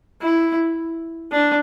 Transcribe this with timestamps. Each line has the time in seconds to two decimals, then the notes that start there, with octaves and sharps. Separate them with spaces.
0.21 E4
1.31 D4